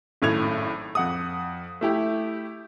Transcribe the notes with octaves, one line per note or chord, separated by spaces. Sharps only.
G#1 F#2 A2 A4 G#6 F7
F2 F#5 D#6
A3 E4 G4